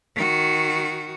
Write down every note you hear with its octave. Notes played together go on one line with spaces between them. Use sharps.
D#3 F#4